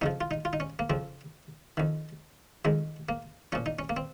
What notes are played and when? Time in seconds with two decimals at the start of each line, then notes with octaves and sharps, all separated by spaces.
0.01 F2 C#3 F3 D#4
0.21 F4
0.31 D#4
0.45 F4
0.53 D#4
0.60 C#4
0.79 A#3
0.90 F2 C#3 F3 C4
1.77 F2 D#3
2.65 F2 D#3 G#3
3.09 A#3
3.52 A#2 F3 C#4
3.66 D#4
3.79 C#4
3.89 A#3
3.97 C4